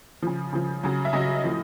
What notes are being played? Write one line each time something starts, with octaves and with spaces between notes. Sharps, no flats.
C#3 F3
C#3 F3
C#3 F#3
E5
C#3 F#3 D#5
A2 F3